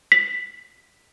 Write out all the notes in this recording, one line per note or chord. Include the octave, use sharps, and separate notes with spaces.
B6